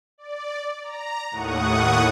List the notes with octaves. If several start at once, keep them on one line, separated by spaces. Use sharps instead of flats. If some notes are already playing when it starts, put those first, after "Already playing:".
D5
A#5
D#2 A2 F#5 C#6 D#6